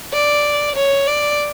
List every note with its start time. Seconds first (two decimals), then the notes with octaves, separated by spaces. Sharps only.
0.13 D5
0.76 C#5
1.07 D5